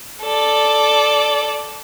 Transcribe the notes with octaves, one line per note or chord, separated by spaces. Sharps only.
A4 D5